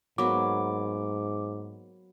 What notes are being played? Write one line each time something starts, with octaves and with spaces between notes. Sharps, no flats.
G#2 F#3 A#3 B3 D6